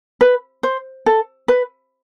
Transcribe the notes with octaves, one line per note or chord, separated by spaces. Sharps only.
B4
C5
A4
B4